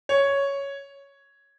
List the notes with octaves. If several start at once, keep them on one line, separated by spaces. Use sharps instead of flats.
C#5